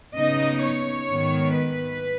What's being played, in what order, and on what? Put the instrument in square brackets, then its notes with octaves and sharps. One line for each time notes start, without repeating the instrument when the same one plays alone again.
[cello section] C#3 B3 D#4 D#5
C#5
G#2 D#3 B3
B4